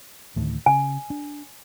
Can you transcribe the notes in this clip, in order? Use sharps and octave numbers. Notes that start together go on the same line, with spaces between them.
D2 A2 D#3
C#3 G#5
D4